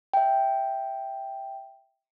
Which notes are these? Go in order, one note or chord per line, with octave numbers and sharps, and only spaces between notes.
E5 G5